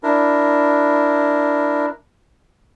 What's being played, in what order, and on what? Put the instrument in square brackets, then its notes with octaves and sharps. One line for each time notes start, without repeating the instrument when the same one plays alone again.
[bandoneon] D4 E4 A#4